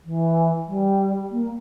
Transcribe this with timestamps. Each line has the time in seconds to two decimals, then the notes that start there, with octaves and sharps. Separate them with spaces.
0.05 E3
0.68 G3
1.31 A#3